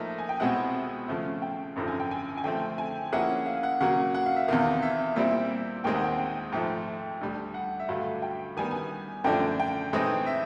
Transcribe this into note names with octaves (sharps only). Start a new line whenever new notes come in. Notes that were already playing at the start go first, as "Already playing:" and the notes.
Already playing: A2 F3 A#3 D#4 E5
G#5
G5
C2 B2 G#3 C4 E4 F#5
C#3 F3 A3
G5
G#1 F#2 D3 F3
G#5
G5
G#5
G#5
D3 F3 A3 C4 G5
G#5
F3 A#3 C#4 E4 G#4 F#5
F5
F#5
C#3 F#3 A#3 F#5
F#5
F5
E5
E2 C3 D#3 F5
E5
A#2 G3 C4 E4 E5
D#2 D#3 G#3 C4 G5
F#5
G5
G5
G#2 F3 A3 G5
D2 D3 G3
F#5
E5
G2 D3 F#3 A3 F5
G5
D#3 G3 B3 G#5
G#5
F#2 D3 F3 A3 D4 G5
G5
A2 E3 G#3 C4 D#4
E5